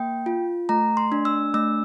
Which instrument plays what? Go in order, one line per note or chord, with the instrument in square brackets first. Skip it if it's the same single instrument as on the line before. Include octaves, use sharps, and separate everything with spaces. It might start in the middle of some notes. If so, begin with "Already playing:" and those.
Already playing: [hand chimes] A#3 G5
F4
A3 A#5
C6
D4
E6
A3 E6